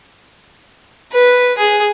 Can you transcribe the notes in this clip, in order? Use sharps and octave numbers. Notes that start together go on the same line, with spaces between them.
B4
G#4